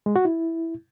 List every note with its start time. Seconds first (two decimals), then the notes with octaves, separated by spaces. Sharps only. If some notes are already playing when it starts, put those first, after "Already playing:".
0.06 G#3
0.16 F#4
0.25 E4